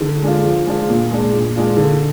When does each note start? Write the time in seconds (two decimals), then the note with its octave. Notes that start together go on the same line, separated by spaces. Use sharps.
0.01 D3
0.23 G#3 D4 F4
0.44 F3
0.66 G#3 D4 F4
0.89 A#2
1.11 G#3 D4
1.33 A#2
1.55 G#3 D4 F4
1.77 D3